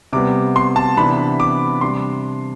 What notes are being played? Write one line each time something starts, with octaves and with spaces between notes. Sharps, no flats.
C3 G3 B3 D6
C6
A5
C3 E3 B3 D4 B5
D6
C3 G3 D4 C6